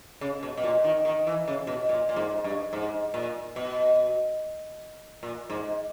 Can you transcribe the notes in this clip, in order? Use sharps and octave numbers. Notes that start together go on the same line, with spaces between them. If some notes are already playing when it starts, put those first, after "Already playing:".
C#3
B2
B2
A#2
D#3
D#3
E3
C#3
B2
A#2
A#2
G#2
G2
G#2
A#2
B2
A#2
G#2